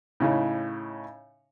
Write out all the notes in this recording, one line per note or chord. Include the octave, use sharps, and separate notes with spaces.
A2 C#3 D#4